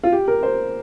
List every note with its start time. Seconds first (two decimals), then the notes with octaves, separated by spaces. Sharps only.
0.03 F4
0.12 G4
0.28 A#4
0.43 C5